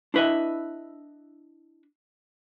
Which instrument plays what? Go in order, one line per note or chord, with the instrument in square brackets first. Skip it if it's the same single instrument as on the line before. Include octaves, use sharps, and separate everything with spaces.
[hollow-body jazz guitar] D4 E4 B4 D#5 E5